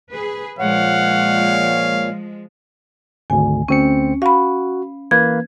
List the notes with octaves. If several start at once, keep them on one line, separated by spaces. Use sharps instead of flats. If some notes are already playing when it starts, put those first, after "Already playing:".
G#4 B4
A#2 F3 G#3 C#5 F5 F#5
G#1 D2 G#5
D2 C4 C#4 C#7
F#4 F5 B5
E3 A#3 B4 G#6